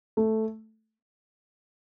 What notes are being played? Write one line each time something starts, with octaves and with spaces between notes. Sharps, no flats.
A3